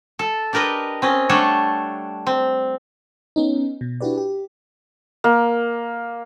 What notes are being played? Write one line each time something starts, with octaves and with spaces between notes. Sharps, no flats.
A4
D4 G4 A#4 B4 D#5
C4 C#4 D#5
G3 A3 D4 A4 C#5 F#5
C4
B3 C#4 D#4
B2
D4 E4 F#4 G4 B4 D5
G4
A#3